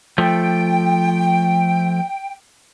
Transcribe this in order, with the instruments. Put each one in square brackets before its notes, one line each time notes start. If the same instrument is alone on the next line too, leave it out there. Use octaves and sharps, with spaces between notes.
[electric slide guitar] F3 A3 [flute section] G5